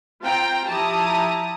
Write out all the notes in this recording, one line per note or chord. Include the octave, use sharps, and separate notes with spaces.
C4 F4 G5 A#5
F3 E4 G4 A5 A#5 D#6